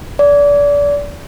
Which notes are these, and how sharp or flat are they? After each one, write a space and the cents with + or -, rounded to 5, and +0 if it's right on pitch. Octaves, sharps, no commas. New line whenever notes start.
D5 -30